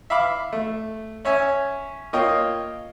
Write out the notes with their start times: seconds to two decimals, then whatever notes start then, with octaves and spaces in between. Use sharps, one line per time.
0.10 E5 F5 B5 D6
0.53 A3
1.25 C#4 C#5 E5 G#5
2.13 A#3 F4 C#5 D#5 G5